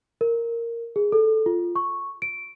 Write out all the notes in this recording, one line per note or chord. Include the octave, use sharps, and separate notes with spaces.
A#4
G#4
A4
F4
C#6
D7